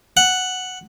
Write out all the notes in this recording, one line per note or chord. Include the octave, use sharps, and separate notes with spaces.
F#5